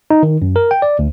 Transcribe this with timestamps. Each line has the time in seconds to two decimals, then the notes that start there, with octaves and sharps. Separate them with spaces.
0.10 D#4
0.23 D#3
0.42 F#2
0.56 A#4
0.71 G5
0.82 D5
0.99 D2